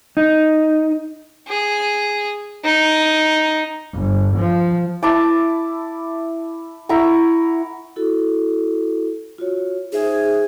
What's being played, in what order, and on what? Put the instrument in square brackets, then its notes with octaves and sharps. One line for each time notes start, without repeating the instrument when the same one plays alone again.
[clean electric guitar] D#4
[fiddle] G#4
D#4
[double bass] G1
F3
[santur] E4 A5 D6
E4 F#5 A#5 C#6
[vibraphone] E4 F#4 A4
F4 F#4 C#5
[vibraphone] D#4 C5 E5 [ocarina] G#4